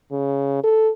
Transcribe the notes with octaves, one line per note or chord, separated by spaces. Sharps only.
C#3
A4